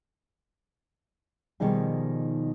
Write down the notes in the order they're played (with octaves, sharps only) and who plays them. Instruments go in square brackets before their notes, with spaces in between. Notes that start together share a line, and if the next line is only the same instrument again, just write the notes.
[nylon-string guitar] B2 D#3 F3 G3 D#4 G#4